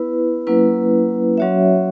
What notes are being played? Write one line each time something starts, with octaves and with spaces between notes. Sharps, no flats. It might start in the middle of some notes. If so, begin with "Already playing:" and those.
Already playing: B3 E4 B4
F#3 A#3 C#4 E4 B4
F#3 C#4 F#4 C#5 E5